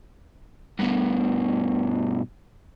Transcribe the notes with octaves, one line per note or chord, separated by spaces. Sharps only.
G2 B2